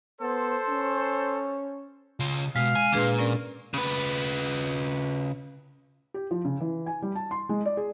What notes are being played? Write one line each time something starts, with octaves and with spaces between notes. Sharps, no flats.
B3 A4 C5
C#4
C#3 F4
B2 G#3 F5
G#5
D2 A#2 D4 G#4 B4
C#4 A#4 D5
C#3 B4
G4
F3
C#3
E3
G#5
G3
A5
C6
G#3
D5
G#4